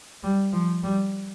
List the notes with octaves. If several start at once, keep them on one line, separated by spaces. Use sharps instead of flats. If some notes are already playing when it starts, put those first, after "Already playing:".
G3
F3
G3